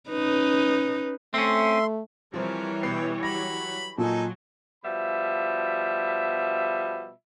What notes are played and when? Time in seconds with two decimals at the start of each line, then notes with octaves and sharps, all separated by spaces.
0.10 C#4 D#4 B4
1.34 A3 C4 C#4 E5 C6
2.34 E3 F3 G3 C4 A#4 C#5
2.83 B2 B4 G5 C7
3.23 F#3 G4 B5 A#6
3.98 A#2 F#3 D#4 A4 G#5
4.84 B2 F3 G3 E5 B5